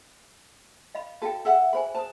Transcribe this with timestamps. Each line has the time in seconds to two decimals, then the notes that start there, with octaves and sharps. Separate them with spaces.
0.95 D#5 F5 B5
1.22 F#4 A4 F5 G5
1.45 A4 E5 F#5
1.73 G#4 C5 G#5 B5
1.95 C5 A5 D#6